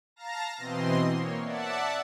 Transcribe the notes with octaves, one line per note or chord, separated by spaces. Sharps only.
F5 A5 A#5 A#6
B2 E3 C4 D#5 C6
A#3 C#5
D5 E5 F#5 A5